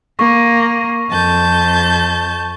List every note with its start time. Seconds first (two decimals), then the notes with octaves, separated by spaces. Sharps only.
0.19 A#3 C#6
1.10 F2 A5 G6